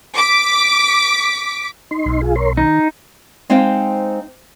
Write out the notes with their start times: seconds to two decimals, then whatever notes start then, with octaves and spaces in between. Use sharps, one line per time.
0.16 D6 B6
1.91 D#4 C6
2.06 B1
2.22 F4 G#4
2.36 A#4 C#5 C6
2.57 D#3 D#4
3.50 G#3 C4 D#4 C5 F5 G5